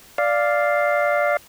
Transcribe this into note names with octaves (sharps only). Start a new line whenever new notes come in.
D5 F5